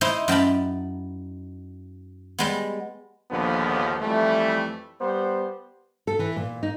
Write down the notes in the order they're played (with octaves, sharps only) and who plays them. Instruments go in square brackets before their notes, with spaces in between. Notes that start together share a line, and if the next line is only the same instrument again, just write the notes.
[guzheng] D#4 E4 C5
F#2 G5 A5 B5
G3 G#3 B3
[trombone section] A#1 D#2 D3 F3 B3
F2 E3 G3 A3
G3 B3 C5
[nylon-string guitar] A4
E3
A#2
D#4